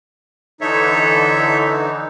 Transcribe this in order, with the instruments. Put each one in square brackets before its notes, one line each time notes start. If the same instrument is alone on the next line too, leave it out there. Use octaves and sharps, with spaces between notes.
[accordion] D3 E3 D#4 [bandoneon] A4 C#5 E5